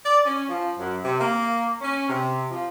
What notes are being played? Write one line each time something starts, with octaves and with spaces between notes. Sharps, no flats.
D5
C#4
F3
F#2
C3
A#3
C#4
C3
F3